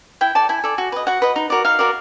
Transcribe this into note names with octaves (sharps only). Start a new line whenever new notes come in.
E4 G5
A4 D5 A5
E4 G#5
A4 D5
F#4
B4 D#5
F#4 F#5
B4 D#5
D#4
F#4 A#4 D5
D#4 F5
F#4 A#4 D5